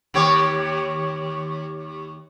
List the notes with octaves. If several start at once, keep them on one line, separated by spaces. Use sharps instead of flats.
D#2 G4 C#5